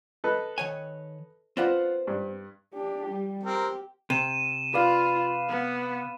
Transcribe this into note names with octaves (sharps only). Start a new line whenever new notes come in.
A4 B4 D#5
D#3 C#5 G#5
C4 F4 B4 C5 D5 F#5
G2
D4 G4
G3
C4 G4 A#4
C3 D#7 E7
F4 B4 D5 F5
B3